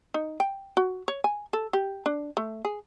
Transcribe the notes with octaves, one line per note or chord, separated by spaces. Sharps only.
D#4
G5
F#4
C#5
G#5
A4
G4
D4
A3
G#4